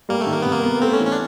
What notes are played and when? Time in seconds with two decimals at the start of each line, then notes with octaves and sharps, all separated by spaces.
0.09 G3 A#3
0.21 A3
0.27 D#3
0.32 A#3
0.42 C3 B3
0.51 A#3
0.63 B3
0.82 A3 C4
0.93 C#4
1.00 E3
1.05 C#4
1.12 D4